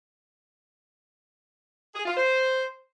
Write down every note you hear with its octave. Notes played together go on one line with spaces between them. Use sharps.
G#4
F4
C5